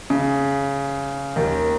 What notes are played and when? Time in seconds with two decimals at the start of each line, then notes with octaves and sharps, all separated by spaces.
0.10 C#3
1.36 D#2 D#3